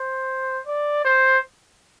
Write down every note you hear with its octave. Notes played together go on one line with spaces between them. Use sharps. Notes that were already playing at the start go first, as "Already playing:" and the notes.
Already playing: C5
D5
C5